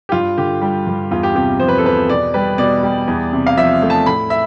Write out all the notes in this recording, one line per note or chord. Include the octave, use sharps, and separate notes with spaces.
G4
G2 F4
D3 G4
G3
G2
E2 F4
G4
C3 G4
F3 C5
B4
A4
E2 B4
B2 D5
G3 B4
B2 D5
G3
E2
C3
F5
F3 E5
A3
A5
A2 B5
E5